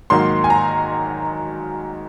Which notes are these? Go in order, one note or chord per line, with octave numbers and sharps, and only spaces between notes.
G#2 D#3 F#3 A#3 C6
G#5
A#5